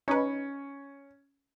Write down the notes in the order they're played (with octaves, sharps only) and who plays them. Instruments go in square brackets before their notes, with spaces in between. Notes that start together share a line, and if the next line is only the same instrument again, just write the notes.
[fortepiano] C#4 [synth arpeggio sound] D#4 B4